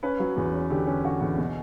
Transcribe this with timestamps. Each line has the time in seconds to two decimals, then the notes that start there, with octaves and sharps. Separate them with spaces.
0.03 C#4 B4
0.19 F#3
0.36 E2
0.54 C#4
0.70 D3 G4
0.87 C#4
1.04 D3 F#4
1.21 E2
1.38 B2